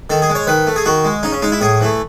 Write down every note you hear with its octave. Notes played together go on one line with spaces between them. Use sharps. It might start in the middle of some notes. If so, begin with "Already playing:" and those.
D#3 A4
G#4
G#3
C#5
D#3 B4
A3
G#4
D#3 F#4
G#3
C#3 D#4
C#4
G#3 D#4
E4
A2 G#4
E3 A3